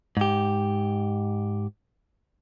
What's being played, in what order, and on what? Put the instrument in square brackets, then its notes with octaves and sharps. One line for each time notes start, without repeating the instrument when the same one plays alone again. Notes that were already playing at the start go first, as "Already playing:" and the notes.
[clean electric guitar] G#2 G4